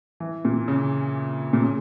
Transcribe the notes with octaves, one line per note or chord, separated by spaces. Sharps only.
E3
A#2
C#3
A#2
C#3